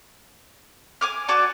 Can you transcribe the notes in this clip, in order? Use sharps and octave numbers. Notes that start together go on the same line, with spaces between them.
G#5 D6 F6
F#4 D5 G#5 A5